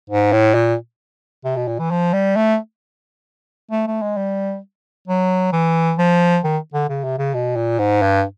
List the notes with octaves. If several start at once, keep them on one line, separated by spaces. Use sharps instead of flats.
G#2
A2
A#2
C3
B2
A#2
E3
F3
G3
A3
A3
A3
G#3
G3
F#3
E3
F3
D#3
D3
C#3
C3
C#3
B2
A#2
G#2
G2